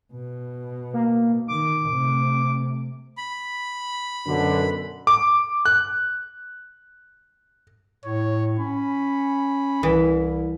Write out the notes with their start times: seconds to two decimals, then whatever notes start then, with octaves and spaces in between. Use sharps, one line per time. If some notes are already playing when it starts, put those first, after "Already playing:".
0.13 B2
0.93 A#3
1.48 D#3 D6
1.90 C3 A3
3.18 B5
4.27 F#2 B2 D3
5.07 D6
5.66 F#6
8.04 A2 C#5
8.59 C#4 B5
9.83 C2 E3